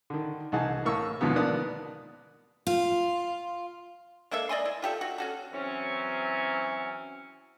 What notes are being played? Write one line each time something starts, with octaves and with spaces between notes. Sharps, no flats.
D3 D#3
C2 E3 D#4 G#4 F#5 A5
A2 A#3 C#6 E6
D#2 G#2 B2 F3 B3
A#3 B3 D5 A5 D#6 F#6
F4
G#3 A#3 A4 E5
D5 D#5 G#5 C6
E4
F4 G4 A4 E5
F#4
C#4 F#4 A4
E3 F#3 C4 C#4